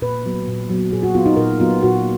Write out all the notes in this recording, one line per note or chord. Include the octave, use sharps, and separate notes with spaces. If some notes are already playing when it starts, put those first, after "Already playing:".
A#2 B4
F#3 B3
A#2
F#3 B3
A#2 G#4
F#4
F#3 B3 F4
D#4
A#2 A#4
F#3 B3 F4
A#2 F#4